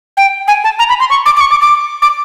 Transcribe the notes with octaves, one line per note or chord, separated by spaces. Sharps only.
G5
G#5
A5
A#5
B5
C6
C#6
D6
D6
C#6
D6
D6
D6